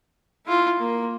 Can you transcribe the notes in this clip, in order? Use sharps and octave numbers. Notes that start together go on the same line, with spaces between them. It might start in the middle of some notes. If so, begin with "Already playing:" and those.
E4 F4
A#3